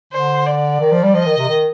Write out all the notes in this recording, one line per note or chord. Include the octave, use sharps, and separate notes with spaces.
D3 C5
D5
D#3
F3
G3
F3 D#5
D#3
C3
D#3